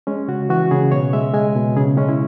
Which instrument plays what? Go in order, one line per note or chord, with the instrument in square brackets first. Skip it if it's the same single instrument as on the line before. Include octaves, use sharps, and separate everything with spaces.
[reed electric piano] G#3 C#4
C#3 F#4
E3 F#4
C#3 G#4
B2 C#5
G#3 E5
G#3 G#5
B2
C#3 G#4
G#3 C#4
E4